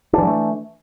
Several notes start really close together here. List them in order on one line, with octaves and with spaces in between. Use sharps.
D4 E3 F#3 A3